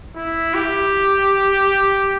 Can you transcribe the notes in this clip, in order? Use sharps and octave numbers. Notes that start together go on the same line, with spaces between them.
E4
G4